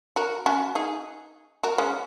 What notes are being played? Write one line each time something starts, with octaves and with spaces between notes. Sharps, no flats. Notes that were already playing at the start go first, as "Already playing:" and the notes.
F#4 A#4
C#4 F#4
D#4 G#4
F#4 A#4
G#3 C#4